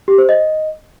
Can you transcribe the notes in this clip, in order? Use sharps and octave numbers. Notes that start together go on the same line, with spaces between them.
G4
C5
D#5